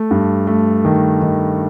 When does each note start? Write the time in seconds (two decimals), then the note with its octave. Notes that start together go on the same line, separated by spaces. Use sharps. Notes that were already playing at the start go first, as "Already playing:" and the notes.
Already playing: A3
0.11 G2
0.47 A3
0.85 D#3
1.22 D#3